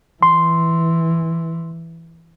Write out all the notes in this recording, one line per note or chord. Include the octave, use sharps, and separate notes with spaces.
E3 C6